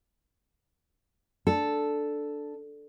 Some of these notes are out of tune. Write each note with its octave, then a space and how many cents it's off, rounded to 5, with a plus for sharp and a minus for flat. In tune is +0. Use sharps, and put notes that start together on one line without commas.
D4 +0 A4 +0